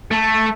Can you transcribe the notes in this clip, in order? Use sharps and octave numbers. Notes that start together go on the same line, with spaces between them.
A3